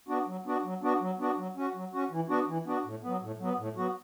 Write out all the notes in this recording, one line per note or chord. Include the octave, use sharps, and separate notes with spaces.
B3 D4 F#4
F#3
B3 D4 F#4
F#3
B3 D4 F#4
F#3
B3 D4 F#4
F#3
C#4 F#4
F#3
C#4 F#4
E3
B3 D4 F#4
E3
B3 D4 F#4
A2
F#3 B3
A2
F#3 B3
A2
F#3 B3 F#4